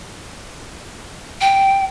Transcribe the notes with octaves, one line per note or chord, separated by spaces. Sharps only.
G5